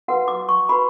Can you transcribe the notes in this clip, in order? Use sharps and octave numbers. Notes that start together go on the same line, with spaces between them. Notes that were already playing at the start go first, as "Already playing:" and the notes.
F#4 B4 F#5
D6
C#6
F#4 B4 B5